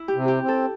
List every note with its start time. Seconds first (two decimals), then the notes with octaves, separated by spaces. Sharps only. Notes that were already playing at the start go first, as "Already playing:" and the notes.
Already playing: E4
0.08 G4
0.15 C3
0.28 G4
0.41 C4
0.48 A4